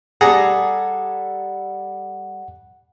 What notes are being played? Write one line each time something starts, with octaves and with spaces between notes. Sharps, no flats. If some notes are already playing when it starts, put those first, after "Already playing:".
G3 G#4 A4 F#5 A#5